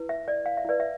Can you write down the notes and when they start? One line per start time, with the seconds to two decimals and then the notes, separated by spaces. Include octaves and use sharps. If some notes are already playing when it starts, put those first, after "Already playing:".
Already playing: E4 B4
0.09 E5
0.28 D5
0.46 F5
0.57 E5
0.65 E4 B4 D5
0.80 E5